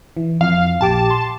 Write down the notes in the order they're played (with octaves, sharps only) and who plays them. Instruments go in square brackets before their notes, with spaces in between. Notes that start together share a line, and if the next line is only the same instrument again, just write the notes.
[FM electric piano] E3
[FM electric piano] F2 [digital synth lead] F5
[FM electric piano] A#1 G4 D6 [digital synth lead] A5
[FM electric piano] C6